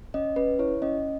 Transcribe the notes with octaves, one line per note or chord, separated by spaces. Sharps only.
C#4 D#5
C#4 B4
E4 C#5
C#4 D#5